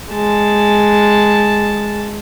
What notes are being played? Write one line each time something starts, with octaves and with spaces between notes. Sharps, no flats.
G#3 A5